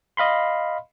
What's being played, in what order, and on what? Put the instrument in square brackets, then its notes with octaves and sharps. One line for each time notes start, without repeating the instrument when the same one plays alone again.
[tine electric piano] D#5 F5 B5 C6